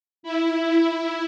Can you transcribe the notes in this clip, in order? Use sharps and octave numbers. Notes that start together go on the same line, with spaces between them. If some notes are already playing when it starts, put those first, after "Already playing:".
E4